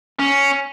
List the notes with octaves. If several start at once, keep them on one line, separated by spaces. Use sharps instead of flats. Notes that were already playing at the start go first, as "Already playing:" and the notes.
C#4